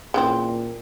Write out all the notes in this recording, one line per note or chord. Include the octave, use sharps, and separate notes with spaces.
A#2 C#3 E3 C4